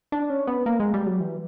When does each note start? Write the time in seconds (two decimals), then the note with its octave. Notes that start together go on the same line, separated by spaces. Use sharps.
0.12 D4
0.30 C#4
0.47 B3
0.66 A#3
0.80 G#3
0.94 G3
1.06 F#3
1.20 E3